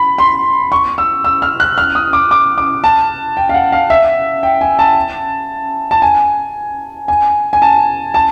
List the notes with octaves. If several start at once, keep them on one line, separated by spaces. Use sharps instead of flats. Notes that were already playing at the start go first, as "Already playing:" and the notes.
Already playing: B5
C6
C#6
E6
E6
F6
F#6
F6
D#6
D6
D6
D6
A5
G5
F5
F#5
F5
E5
G5
G#5
A5
A5
G#5
G#5
G#5
A5
A5